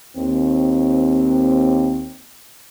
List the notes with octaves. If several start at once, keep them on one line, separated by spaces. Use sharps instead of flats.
D#2 C4